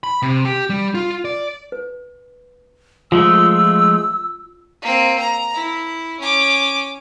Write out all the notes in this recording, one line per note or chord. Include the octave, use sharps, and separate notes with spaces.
B5
C3
G4
G3
F4
D5
B4
F3 G#3 A3 F4 E6
A#3 C4
A#5
E4
C#4 D6